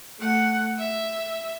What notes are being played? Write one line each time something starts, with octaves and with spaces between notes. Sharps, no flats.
A3 F#5
E5